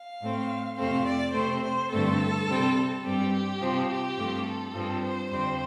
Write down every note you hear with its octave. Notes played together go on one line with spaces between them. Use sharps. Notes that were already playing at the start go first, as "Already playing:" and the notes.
Already playing: F5
A2 A3 C4
F2 C3 A3 C4 F5
D5
C3 A3 C4 C5
C5
G2 D3 A3 C4 A4
C3 G3 C4
G2 G3 C4 G4
G4
C3 F3 C4
G4
G2 F3 A3 C4
A4
G2 F3 C4
C5
F2 D3 G3 C4 C5